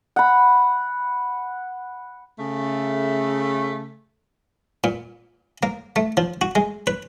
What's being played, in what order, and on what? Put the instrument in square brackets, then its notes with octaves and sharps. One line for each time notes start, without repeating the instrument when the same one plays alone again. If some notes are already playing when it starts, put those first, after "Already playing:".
[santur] F#5 B5
[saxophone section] C#3 A3
[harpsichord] A#2
A#3
A3
F3
F#4
G#3
B4